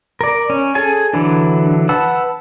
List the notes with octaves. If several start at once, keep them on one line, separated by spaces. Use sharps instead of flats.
A#4 D5
C#4
G#4 A4 G#5
D3 E3 F#3 D4
B4 F#5 A5 E6